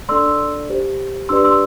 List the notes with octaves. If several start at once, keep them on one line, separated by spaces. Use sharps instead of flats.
D4 A4 D5 C6 E6
G4 C5
D4 G4 B4 D5 C6 E6
C6 E6